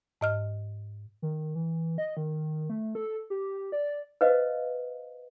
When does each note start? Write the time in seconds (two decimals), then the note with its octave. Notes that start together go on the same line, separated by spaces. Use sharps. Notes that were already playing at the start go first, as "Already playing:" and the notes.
0.21 G#2 D#5 F6
1.22 D#3
1.55 E3
1.98 D#5
2.17 D#3
2.69 A3
2.95 A4
3.30 G4
3.72 D5
4.21 B4 C5 D#5 F5